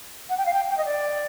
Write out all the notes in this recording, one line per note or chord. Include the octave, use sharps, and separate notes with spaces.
F#5
G5
F5
G5
G5
D#5
D5